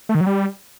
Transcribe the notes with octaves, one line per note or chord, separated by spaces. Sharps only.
A3
D#3
F#3
G3